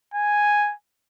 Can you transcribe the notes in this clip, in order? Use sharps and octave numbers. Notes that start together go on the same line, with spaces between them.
G#5